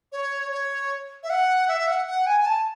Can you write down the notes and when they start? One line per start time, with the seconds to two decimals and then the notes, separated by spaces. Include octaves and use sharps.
0.12 C#5
0.51 C#5
1.23 E5
1.30 F#5
1.68 E5
1.87 F#5
2.07 F#5
2.26 G#5
2.41 G#5
2.46 A5